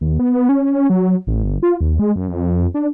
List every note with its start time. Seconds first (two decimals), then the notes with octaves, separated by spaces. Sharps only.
0.01 D#2
0.19 B3
0.49 C#4
0.90 F#3
1.27 A1
1.43 G1
1.63 F4
1.81 D#2
1.99 G#3
2.16 F#2
2.29 F2
2.74 D4